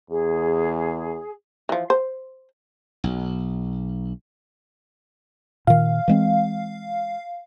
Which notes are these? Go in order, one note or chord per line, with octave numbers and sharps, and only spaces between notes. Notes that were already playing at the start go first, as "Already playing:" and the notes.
E2 G#4
E3 F3
C5
B1
A#2 D#3 F5
E3 G#3 C4